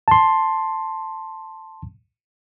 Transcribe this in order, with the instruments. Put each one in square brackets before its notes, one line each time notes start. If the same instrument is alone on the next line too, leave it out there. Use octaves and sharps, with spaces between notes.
[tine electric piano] A5 C6